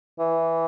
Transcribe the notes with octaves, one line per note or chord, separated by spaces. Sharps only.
E3